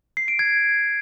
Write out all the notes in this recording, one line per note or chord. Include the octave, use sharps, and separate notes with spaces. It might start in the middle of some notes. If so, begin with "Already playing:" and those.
C7
D7
G#6